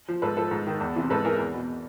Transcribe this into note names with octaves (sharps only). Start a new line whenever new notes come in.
F3
G#2 A4 B4
F3 A4 B4
G#2
D#3
E2
C3 E3
G#2 A4 B4
E3 G#4 A#4
E2
B2